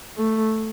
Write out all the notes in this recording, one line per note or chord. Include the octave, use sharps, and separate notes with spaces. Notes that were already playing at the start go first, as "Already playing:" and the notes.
A3